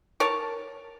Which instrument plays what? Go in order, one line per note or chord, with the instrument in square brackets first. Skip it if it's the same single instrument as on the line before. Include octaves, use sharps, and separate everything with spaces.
[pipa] A#4 C#5 A5